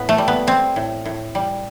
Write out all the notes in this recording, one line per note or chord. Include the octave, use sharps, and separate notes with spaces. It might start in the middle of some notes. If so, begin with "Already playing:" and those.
Already playing: A2 B3
A3
G3
B3
G3 C4
A2
A2
G3